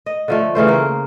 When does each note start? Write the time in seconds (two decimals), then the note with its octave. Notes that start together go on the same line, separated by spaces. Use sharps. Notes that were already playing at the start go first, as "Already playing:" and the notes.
0.06 D#5
0.28 D3 F3 A3
0.55 C#3 E3 A3 C5
0.68 A#3